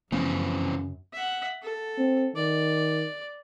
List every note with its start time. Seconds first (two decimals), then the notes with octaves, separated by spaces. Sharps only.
0.12 F#2 C#3 E3 F3 A3 B3 C4
1.13 E5 F#5
1.63 A4
1.98 C4
2.36 D#3 D5